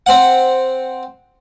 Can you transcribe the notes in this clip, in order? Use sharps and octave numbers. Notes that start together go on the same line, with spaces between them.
C4 F#5